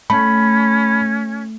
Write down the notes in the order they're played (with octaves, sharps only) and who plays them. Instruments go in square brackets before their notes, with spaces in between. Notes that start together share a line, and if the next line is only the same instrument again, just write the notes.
[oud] A3 [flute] C#4 [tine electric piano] B5